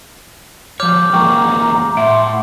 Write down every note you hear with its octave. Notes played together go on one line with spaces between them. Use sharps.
F3 C#5 D6 F6 G6
E2 G#3 A#3 G5 A#5 C#6
A2 E5 F#5 C6